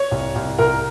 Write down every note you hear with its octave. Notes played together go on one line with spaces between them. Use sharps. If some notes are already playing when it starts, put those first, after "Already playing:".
Already playing: C#5
C2
C2
C2 A#4